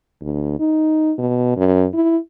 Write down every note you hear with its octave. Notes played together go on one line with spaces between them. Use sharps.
D2
D#4
B2
F#2
E4